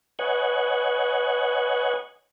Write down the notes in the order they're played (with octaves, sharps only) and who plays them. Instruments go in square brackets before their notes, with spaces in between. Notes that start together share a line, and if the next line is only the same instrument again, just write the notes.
[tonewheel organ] B4 C#5 D#5 F#5 G#5